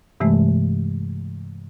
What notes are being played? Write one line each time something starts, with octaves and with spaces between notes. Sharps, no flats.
G2 C3 E3 G#3 A3